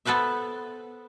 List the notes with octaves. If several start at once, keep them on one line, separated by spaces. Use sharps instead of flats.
B3 A4 B4 C5 E5